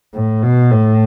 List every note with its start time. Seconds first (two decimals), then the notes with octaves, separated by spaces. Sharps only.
0.14 A2
0.43 B2
0.71 A2